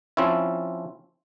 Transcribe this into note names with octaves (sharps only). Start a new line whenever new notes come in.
F3 C4 C#4 E4